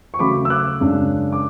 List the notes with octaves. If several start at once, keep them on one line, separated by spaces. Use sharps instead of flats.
C#6
C#3 F#3 A3 B5 D6
E6
D6 F#6
F#2 C#3 G#3 D4
D6